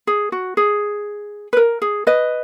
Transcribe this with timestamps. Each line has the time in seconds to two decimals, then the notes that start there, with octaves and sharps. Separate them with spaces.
0.07 G#4
0.32 F#4
0.57 G#4
1.53 B4
1.57 A#4
1.82 G#4
2.07 B4 D#5